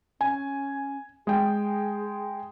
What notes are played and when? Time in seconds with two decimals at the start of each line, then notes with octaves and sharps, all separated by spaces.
0.21 C#4 G#5
1.27 G#3 G#4 G5